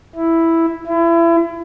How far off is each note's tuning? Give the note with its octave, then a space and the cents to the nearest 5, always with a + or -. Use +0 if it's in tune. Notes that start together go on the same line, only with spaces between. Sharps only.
E4 +0
E4 +30